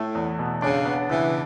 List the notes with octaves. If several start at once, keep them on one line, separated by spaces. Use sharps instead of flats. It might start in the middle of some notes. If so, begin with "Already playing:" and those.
Already playing: A2 A3 E4
E2
B2
C#3 D4
B3
C#3 E3